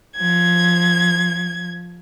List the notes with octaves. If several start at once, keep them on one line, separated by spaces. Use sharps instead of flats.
F3 G#6